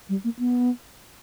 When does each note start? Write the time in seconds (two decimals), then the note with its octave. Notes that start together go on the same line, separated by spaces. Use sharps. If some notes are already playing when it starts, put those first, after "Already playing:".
0.09 G3
0.24 A#3
0.39 B3